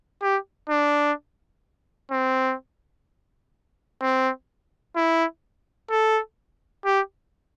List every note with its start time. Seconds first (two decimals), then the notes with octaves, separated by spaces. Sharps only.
0.22 G4
0.69 D4
2.11 C4
4.01 C4
4.96 E4
5.91 A4
6.85 G4